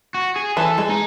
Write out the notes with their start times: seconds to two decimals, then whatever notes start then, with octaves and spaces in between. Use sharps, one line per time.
0.15 F#4
0.36 G#4
0.57 E3 A4
0.78 G#3
0.90 D#4